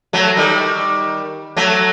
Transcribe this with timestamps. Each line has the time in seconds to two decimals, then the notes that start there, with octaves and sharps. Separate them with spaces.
0.13 F#3 A3
0.37 D#3 G3
1.57 F#3 A3